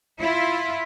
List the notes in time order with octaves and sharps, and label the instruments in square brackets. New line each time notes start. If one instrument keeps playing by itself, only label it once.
[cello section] E4 F4